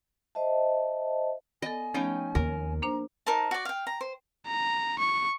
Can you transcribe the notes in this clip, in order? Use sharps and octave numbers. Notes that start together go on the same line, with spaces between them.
C5 D#5 E5 A5
B3 A4 D#5 G#5
F3 A3 B3 C#4 D#4 G5
D#2 A#4
A#3 D4 C5 A#5
D#4 A#4 C5 A5
F#4 D5
F5 G5
A#5
C5
A#5
C#6